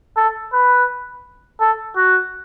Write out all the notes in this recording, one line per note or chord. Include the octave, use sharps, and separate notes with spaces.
A4
B4
A4
F#4